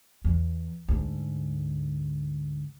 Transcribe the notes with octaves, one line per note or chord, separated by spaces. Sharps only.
E2
D2 G#2